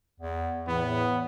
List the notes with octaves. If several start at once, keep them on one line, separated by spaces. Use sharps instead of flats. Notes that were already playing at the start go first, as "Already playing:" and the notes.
E2
E2 A2 B3